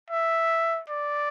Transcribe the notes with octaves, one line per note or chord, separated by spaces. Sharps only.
E5
D5